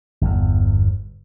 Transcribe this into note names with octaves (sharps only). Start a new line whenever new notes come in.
G1 E2